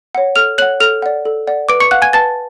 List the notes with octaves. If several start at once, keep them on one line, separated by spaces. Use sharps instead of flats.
C#5 F#5
A4 F6 F7
C#5 F#5 F#6 F#7
A4 F6 F7
D5 F#5
A4
D5 F#5
B4 D6 D7
C#6 C#7
F5 F#5 F#6
G#5 G#6
B4 A5 A6